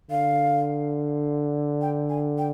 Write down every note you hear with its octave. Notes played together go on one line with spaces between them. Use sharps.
D3 F5
G5
G#5
G5